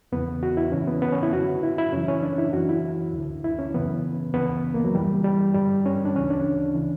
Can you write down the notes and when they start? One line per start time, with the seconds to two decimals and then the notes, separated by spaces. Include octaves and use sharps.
0.12 E2 C#3 E3 B3
0.43 F#4
0.57 E4
0.72 F#2 C#3 E3 C#4
0.87 B3
1.02 B3
1.12 C#4
1.23 E4
1.32 F#2 D3 F#4
1.63 E4
1.78 E4
1.93 F#2 C#3 E3 C#4
2.08 C#4
2.23 D4
2.38 E4
2.53 F#2 E3 F#4
2.69 E4
3.13 D2 D3
3.44 E4
3.59 C#4
3.74 F#2 C#3 E3 B3
4.34 D2 C#3 E3 B3
4.74 A#3
4.84 F#3
4.95 F#2 E3 G3
5.24 G3
5.54 G2 D3 G3
5.86 C#4
6.05 D4
6.16 D2 C#3 E3 C#4
6.30 D4
6.75 C#3 E3